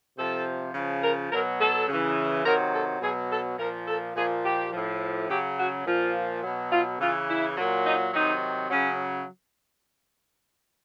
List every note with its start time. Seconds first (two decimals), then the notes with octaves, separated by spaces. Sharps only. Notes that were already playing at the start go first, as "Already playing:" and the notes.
0.17 C3 F3 A4
0.74 C#3 F3
1.02 A#4
1.31 B2 F#3 A#4
1.60 A4
1.88 C#3 E3
2.44 C3 D#3 F#3 A#4
2.73 A4
3.01 B2 F#3 G#4
3.30 A4
3.58 A#2 F3 A#4
3.87 A4
4.15 A#2 F3 G#4
4.44 G4
4.72 A2 F3
5.28 C#3 F#3 G4
5.58 F#4
5.86 A#2 F3 F4
6.43 B2 F#3
6.71 F4
6.99 C#3 E3 F4
7.28 E4
7.57 A#2 F#3
7.85 D#4
8.13 C3 D#3 F#3 D#4
8.70 C#3 F#3 C#4